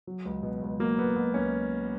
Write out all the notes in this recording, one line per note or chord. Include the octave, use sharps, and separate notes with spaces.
F#3
C#2
B2
C#2
F#3 A#3
C#2 B3
B2 B3
C#2 C#4